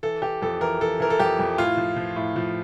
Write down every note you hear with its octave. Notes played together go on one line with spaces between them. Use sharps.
E3 A4
E3 G4
F2 A4
E3 A#4
E3 A4
E3 A#4
A4
F2 G4
F2
A2 F4
F3
F3
A2
F3